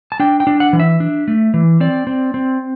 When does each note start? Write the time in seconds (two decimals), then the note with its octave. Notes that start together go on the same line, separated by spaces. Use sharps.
0.12 A5
0.20 D4 G5
0.40 G5
0.47 D4
0.60 F#5
0.73 E3
0.80 E5
1.00 D4
1.28 A3
1.54 E3
1.80 C4 D5
2.07 C4
2.34 C4